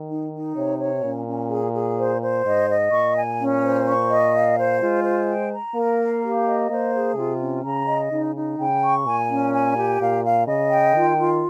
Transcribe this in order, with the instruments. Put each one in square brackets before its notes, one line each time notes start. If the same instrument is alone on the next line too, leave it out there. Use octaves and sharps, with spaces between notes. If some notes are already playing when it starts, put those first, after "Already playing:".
Already playing: [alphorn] D#3
[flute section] D#4
D#4
[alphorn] C3 [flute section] C#5
[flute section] C#5
[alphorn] A#2 [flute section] C#4
[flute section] C#4
G#4
G#4
C5
C5
[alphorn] G#2 [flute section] D#5
[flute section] D#5
[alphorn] A#2 [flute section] C#6
[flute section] G#5
C#4
C5
C#6
D#5
F5
C5
[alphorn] G#3 [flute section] F4
[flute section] C5
G5
A#5
[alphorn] A#3 [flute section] A#4
[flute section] F5
G4
D#5
[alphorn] A#3 [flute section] C5
[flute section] G#4
[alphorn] C3 [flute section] F4
[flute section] C#4
[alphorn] C#3 [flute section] A#5
[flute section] D#5
[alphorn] C#3 [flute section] D#4
[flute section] D#4
[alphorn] C#3 [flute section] G5
[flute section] C#6
[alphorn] A#2 [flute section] G#5
[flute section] C#4
G#5
G4
[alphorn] A#2 [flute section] F5
[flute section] F5
[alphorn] C#3 [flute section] D#5
[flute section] G5
[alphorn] D#3 [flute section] F4
[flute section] F4